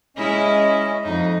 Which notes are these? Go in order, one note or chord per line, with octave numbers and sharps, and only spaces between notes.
G#3 C#4 E4 D#5
F2 D#4